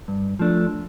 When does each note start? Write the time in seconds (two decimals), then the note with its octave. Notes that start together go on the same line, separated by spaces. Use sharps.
0.08 G2
0.39 F3 A3 D4